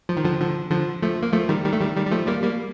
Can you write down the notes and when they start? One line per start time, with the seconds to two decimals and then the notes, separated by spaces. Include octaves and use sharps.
0.09 F3
0.17 D#3
0.25 D3 F3
0.40 D3 F3
0.71 D3 F3
1.02 F3 A3
1.23 A#3
1.33 F3 A3
1.49 D#3 G3
1.65 D#3 G3
1.73 A3
1.80 D#3 G3
1.96 D#3 G3
2.06 G3
2.11 F3 A3
2.27 G3 A#3
2.43 G3 A#3